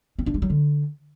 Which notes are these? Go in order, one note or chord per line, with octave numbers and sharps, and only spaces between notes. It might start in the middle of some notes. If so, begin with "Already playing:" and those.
C4
D4
G#3
F#3
D3